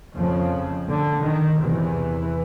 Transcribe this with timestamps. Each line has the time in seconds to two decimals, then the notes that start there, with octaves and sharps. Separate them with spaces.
0.16 F2 C#3 F3
0.88 D3
1.25 D#3
1.60 E2 C3 E3